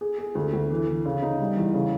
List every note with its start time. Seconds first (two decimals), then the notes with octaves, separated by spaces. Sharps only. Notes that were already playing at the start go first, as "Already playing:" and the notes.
0.01 G#4
0.18 G#4
0.35 D2
0.53 D2
0.70 E3
0.88 E3
1.06 C#3
1.22 D#4
1.40 G3
1.57 E2
1.74 C#3